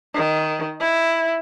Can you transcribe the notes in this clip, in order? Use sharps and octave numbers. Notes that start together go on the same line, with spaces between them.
D#3
E4